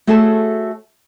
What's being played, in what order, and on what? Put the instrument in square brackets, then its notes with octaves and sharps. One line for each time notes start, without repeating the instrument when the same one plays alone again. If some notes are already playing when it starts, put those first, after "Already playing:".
[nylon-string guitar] A3 F#4 G#4 A4 C#5 A5